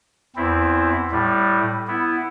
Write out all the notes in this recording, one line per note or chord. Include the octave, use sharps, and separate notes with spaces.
E2 C4 E4
A2 G3
B3 E4